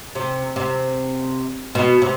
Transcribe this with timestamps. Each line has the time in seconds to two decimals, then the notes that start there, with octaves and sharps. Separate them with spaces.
0.15 C3
0.56 C3
1.75 B2
2.02 C3